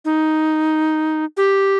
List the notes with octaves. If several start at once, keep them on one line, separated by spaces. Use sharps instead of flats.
D#4
G4